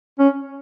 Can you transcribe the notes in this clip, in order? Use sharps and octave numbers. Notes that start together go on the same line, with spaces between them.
C#4